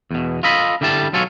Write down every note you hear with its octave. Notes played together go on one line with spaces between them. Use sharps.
E2 B2
F4 A4 D#5 B5
D3 G3 E4 G4 A5
B1 F#3 F4 A4 C#5 G#5